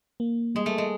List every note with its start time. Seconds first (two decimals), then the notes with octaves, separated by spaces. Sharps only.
0.20 A#3
0.55 G3 G#3
0.66 A3
0.78 G#3